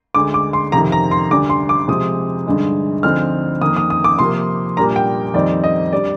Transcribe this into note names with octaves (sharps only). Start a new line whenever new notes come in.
D2 D3 G#3 D6
D6
C6
F2 C3 D#3 A#5
A#5
C6
D2 D3 G3 D4 D6
C6
D6
C3 F3 G#3 C4 D#6
G2 D3 G#3 D#4
D2 D3 F3 C4 D#4 F6
F2 D#3 A#3 D#6
D#6
D#6
D6
C3 F3 A#3 C6
A#2 G3 A#3 D4 A#5
G5
F2 D#3 G3 C4 D#4 D5
D#5
G3 D4 D5